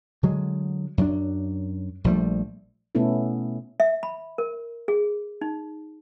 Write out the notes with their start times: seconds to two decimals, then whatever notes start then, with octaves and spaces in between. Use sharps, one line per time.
0.23 D3 F#3 G#3
0.98 F#2 F#3 D4
2.04 A#1 F3 G3 A3
2.95 B2 A3 B3 C#4 E4 A4
3.80 E5
4.03 B5
4.38 A#4
4.88 G#4
5.41 D#4